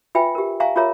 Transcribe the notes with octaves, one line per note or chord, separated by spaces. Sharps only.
F4 B4 E5 G5 G#5
G4 A#4
E5 F5 G#5 A#5 C#6
F4 G#4 A#4 C#5 E5 A#5